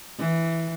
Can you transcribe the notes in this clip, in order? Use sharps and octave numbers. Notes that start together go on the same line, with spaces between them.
E3